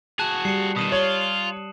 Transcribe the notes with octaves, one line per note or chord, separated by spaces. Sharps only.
F#4 G#4 A5 F#6
G3 C7 C#7
B2 D#3 D#6 D#7 E7
F4 C#5 F#7